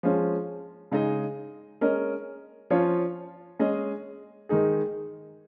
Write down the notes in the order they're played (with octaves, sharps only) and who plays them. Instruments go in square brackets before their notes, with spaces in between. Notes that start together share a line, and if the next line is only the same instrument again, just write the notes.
[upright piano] F3 G#3 C#4
C#3 G#3 D#4 G#4 D#5
G#3 C#4 A#4 D#5
F3 C#4 F4 C#5
G#3 C#4 G#4 D#5
D#3 G#3 D#4 G#4